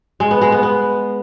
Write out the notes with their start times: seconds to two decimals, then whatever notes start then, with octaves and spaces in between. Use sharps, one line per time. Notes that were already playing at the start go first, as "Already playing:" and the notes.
0.20 G#3
0.31 B3
0.41 G#3
0.52 B3
0.63 B3